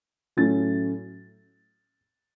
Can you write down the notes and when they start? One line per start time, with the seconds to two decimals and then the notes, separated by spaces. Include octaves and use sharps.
0.37 A2 F#3 A3 C#4 A6